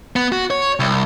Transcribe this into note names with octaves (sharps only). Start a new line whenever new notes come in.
B3
F#4
C#5
C2